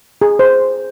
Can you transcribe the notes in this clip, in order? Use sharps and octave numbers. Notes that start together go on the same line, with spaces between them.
G#4
C5